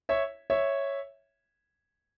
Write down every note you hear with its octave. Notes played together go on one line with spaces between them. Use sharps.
C#5 E5
C#5 E5